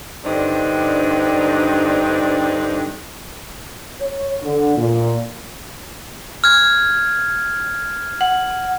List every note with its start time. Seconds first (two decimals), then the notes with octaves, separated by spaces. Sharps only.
0.25 G2 D3 C4 D4 D#4
4.01 C#5
4.43 D3
4.77 A#2
6.44 F6 G#6
8.21 F#5